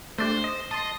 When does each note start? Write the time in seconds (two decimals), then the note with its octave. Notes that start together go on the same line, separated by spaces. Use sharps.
0.19 A3 D4 G4 C5
0.44 D#5
0.71 D#5 A5 C6